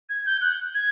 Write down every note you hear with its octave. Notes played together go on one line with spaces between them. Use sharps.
G#6
G6
F#6
G#6